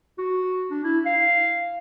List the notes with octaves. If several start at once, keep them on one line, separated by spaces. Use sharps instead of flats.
F#4
D4
E4
F5